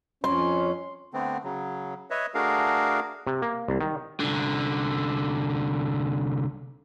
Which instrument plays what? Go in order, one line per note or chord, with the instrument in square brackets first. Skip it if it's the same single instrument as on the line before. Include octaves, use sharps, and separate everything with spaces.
[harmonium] F2 C#4 [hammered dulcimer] C6
[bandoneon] D3 A3 B3 C4
C#3 F#3
B4 C#5 D#5 E5
A3 D4 F#4 G#4 A#4 F5
[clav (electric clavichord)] C3
A#3
C2
D#3
[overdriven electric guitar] C2 D3